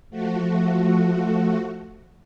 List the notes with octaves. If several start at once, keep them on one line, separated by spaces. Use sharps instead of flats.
F3 A3 F#4